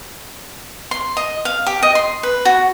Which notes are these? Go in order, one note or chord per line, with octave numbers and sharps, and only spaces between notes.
C6
D#5
F5
G4
D#5
C6
B4
F#4